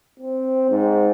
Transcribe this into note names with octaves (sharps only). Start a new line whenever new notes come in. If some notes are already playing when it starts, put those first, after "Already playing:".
C4
G#2